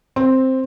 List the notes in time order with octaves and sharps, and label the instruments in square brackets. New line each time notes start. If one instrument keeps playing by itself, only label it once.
[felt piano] C4